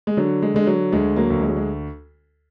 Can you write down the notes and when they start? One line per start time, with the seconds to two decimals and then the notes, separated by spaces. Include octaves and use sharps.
0.07 G#3
0.17 D3 F#3
0.42 G#3
0.54 D3 G#3
0.67 F#3
0.92 D2 G#3
1.16 F#3 A#3
1.30 D2
1.41 G#3
1.49 F#3
1.56 G#3